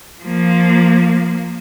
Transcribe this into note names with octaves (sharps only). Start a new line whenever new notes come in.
F3 A#3